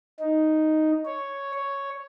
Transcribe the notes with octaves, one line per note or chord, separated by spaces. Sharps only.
D#4
C#5
C#5